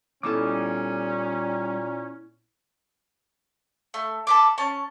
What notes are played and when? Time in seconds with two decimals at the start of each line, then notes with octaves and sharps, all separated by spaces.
0.23 A#2 G3 B3 C#4 D#4 E4 A4 D6
3.94 A3
4.27 A4 B4 D6
4.58 C#4 A5